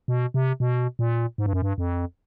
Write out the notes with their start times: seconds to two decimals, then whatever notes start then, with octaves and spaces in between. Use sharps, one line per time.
0.08 B2
0.34 C3
0.60 B2
0.99 A#2
1.38 G#2
1.46 G2
1.53 F#2
1.62 G2
1.78 F2